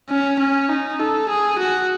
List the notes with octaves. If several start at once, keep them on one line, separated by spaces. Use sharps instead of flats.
C#4
C#4
D#4
A4
G#4
F#4